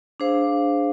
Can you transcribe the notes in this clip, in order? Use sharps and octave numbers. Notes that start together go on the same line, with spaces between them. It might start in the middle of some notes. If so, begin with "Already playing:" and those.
D4 G#4 C5 F5